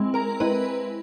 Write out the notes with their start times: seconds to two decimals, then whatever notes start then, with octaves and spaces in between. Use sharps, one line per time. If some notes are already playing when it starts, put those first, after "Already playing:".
Already playing: G#3 C4 E4
0.14 A#4 A#5
0.40 G#3 C4 E4 B4 B5